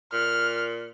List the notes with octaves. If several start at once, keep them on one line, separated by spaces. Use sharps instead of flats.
A#2 F6